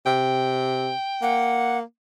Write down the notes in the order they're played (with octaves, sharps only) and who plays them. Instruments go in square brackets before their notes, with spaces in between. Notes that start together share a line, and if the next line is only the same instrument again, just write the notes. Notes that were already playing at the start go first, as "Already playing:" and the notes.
[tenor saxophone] C3 [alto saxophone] G5
[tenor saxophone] A#3 [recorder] F#5